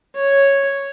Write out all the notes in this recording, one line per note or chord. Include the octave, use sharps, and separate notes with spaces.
C#5